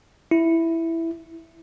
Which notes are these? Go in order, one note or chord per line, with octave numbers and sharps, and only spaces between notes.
E4